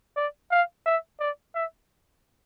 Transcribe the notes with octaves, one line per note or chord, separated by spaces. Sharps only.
D5
F5
E5
D5
E5